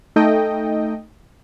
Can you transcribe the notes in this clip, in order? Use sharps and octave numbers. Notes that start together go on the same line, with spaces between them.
A3 D#4 A4 D#5 G5